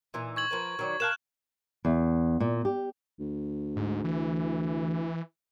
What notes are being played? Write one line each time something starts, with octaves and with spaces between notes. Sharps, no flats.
A#2 E3 D#4
C#6 G#6 F#7
F3 A#4 B4
D#3 F#3 D5
A#4 F5 A5 F6 F#6 E7
E2
A#2
G4
D2
G#2
E3